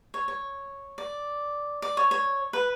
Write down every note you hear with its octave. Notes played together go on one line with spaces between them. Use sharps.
C#5
C#5
D5
D5
C#5
C#5
B4